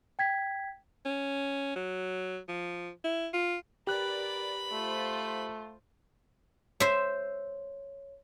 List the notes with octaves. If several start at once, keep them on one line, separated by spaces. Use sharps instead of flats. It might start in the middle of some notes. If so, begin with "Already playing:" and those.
G5 G#6 B6
C#4
F#3
F3
E4
F4
G4 A#4 B4 D5 B5 F#6
A3 F4 C5
C5 C#5 E5